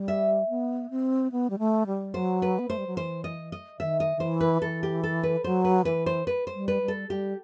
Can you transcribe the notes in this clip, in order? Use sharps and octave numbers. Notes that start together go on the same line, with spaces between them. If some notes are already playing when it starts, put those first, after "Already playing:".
Already playing: G3
E5
B3
C4
B3
G3
A3
G3
F#3 C5
B4
B3
A3 C5
G3
F#3
E3 C5
D#5
D#5
D#3 E5
D#5
D#3
E3 C5
B4
E3 A4
G4
A4
B4
F#3 C5
B4
E3 B4
C5
B4
C5
G3
B4
G3
A4
G3 G4